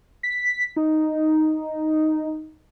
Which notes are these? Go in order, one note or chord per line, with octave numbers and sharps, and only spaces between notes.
B6
D#4